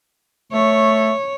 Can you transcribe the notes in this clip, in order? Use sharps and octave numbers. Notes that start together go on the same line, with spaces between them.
A3 C#5